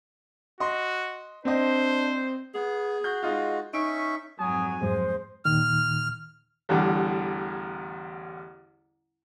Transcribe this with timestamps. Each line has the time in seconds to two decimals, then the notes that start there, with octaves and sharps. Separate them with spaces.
0.60 F#4 D#5 C6
1.45 C4 D4 C5 D#5
2.55 B3 G#4
3.04 F#4 G6
3.23 G#3 D#4 F4
3.74 C#4 D#4 E5 C#6 D7
4.39 F2 G#2 F#3 G#5 D#6
4.82 F2 G#2 F3 F#3 G#3 C5
5.45 D#2 A#2 D#3 F6
6.69 A1 E2 D3 G3